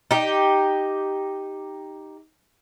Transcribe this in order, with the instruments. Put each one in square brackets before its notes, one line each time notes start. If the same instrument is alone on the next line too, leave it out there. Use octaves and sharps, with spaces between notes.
[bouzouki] D#4 G4